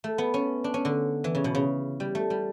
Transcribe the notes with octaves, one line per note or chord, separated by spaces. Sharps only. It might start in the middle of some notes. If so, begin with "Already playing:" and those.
A3
B3
C#4
D4
C#4
D3
E3
C#3
B2
C#3
G3
A3
G3